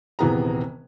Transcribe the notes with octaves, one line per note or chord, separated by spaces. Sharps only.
D#1 C3 E3 B3 G#4 A#5